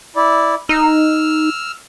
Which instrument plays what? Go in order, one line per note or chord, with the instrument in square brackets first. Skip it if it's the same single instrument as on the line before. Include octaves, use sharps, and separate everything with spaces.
[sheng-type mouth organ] E4 D5
[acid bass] D#4 [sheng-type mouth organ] E6 F6